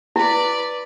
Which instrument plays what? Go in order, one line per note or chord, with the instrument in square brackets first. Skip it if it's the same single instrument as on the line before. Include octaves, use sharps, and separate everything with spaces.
[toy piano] E4 [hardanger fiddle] B4 D5